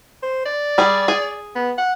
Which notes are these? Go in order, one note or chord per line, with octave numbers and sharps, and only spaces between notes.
C5
D5
G3 G#4
G#4
B3
F#5